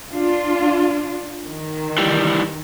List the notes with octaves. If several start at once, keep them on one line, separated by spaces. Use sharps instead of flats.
D4 F4
D#3
E3 G3